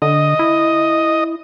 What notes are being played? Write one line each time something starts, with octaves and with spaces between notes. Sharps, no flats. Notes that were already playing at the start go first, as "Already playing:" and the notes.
D3 D#5
E4